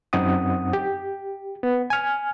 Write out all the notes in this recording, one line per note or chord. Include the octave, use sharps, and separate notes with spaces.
F#2 C4 D#4 F#5 D#6
G4
B3
G#5 F6